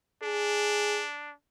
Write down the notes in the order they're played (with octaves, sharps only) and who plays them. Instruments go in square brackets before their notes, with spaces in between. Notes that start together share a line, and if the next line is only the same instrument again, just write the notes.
[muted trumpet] D4 [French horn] G#4